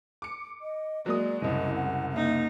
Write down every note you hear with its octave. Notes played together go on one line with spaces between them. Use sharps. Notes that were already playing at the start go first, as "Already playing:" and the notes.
D6 C#7
D#5
F#3 G#3 A#3 D5 D#6
F#1 C2 D#5
F#5
A#3 D#4 E5